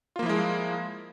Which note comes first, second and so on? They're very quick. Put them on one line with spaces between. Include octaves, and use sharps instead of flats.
F4 A#3 F3 E4 G#3